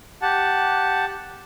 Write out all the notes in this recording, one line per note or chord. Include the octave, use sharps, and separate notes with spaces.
G4 F#5 A5